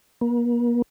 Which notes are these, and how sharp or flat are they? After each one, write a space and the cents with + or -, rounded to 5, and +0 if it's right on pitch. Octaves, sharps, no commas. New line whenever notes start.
A#3 +40